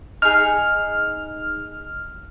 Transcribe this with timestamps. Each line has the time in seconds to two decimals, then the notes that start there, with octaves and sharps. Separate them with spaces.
0.22 D#4 G#4 F6